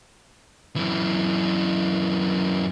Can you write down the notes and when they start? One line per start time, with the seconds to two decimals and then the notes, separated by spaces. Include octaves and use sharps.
0.76 F#2 E3